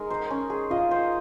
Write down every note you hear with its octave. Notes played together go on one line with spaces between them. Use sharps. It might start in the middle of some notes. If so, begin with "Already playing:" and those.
Already playing: G#3 D#4 A#4
C5
C#4
G#4
F4 D#5
C5